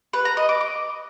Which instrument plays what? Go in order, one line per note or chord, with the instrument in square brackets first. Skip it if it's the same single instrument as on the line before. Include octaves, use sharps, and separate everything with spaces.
[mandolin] B4
A#5
D#5
D6
D6